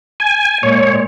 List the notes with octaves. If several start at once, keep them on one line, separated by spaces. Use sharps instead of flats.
G#5
A#2 G#3 C#5